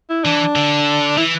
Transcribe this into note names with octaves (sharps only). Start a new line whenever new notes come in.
E4
E3 D4
D3
E3 E4